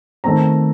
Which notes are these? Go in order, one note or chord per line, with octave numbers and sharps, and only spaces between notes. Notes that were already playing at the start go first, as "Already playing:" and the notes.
D#3 A3 C4 A#5